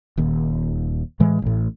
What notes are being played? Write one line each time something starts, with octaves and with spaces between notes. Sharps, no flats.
D#1 D#2
A2 E3 G#3
A1 A2